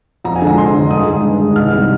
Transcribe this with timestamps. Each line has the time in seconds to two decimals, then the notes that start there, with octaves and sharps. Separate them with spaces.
0.25 F2 A#5
0.36 G#5
0.41 D3 G#3
0.47 A#5
0.58 F2 C6
0.74 D3 G#3
0.91 G2 D#6
1.07 D#3 G#3
1.23 G2
1.40 D#3 G#3
1.56 C2 F6
1.73 C3 D#3 G3